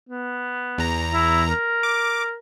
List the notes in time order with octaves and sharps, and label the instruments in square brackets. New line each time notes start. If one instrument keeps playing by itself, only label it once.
[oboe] B3
[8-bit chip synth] E2 A#5
[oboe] E4
A#4
[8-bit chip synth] D6